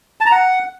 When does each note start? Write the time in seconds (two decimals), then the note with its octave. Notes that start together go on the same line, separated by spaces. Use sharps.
0.21 A5
0.26 A#5
0.32 F#5